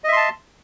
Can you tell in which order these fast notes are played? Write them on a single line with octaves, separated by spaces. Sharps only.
D#5 E5 C6 A5